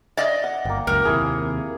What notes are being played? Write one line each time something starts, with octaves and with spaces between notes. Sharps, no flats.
D5 D#5
F#5
G1 A#3 G5
C#2 F#2 A#4
D#2 C3 E4 G#4